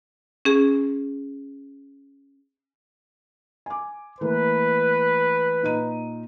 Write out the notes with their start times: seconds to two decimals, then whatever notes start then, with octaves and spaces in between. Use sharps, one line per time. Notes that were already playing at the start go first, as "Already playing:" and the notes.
0.45 C#4 G#4
3.66 G#5 D6
4.21 E3 A3 A#3 B4
5.63 A#2 D#4 D#7